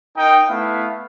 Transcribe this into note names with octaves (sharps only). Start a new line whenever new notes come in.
D#4 A#4 G5
A3 B3 E4 E5 F5